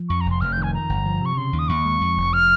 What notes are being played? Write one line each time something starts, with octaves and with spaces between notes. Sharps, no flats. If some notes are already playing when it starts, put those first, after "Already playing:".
Already playing: F3
F2 C#6
F1 A#5
C6
F1 F6
D#3 G6
G#5
F2 A#5
G1
F3
C3 C#6
C#3 C6
D#2
D#6
D#2 C#6
G#3
F2
F1
F3 F6